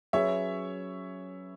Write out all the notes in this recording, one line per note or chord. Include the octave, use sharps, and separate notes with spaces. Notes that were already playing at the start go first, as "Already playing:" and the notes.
F#3 C#4 G#4 B4 C#5 E5